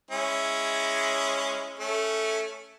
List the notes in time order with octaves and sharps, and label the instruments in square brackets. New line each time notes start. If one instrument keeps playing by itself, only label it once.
[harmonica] G#3 C#4 E4
A3 C#4